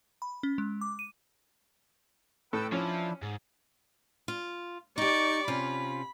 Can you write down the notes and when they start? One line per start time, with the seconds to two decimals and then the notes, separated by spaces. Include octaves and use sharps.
0.22 B5
0.43 C#4
0.58 G#3
0.81 D6
0.99 D#7
2.53 A2 A4 B4 G5 E6
2.72 F3 C#4 D4 E4
3.23 G#2
4.28 F4
4.98 D#4 G4 D5 C#6
5.48 C3 C#4 F4 B5